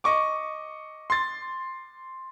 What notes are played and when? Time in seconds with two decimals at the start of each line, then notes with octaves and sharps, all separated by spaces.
0.04 D#5 C#6 D6
1.10 C6 A6